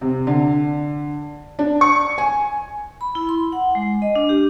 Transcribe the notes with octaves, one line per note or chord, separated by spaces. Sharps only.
C3
D3
D4
C#6
G#5
B5
E4
C6
F#5
G#3
D#5
D4
G4